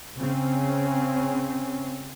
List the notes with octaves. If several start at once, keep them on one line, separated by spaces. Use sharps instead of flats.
C#3 C4 C#4